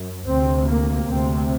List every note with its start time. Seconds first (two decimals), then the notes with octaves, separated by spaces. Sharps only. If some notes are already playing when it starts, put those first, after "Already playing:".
Already playing: F#2
0.28 D2 C3 C4
0.68 A#3
1.09 D2 C3 C4